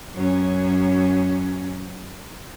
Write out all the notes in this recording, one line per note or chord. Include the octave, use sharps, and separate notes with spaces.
F#2 C#4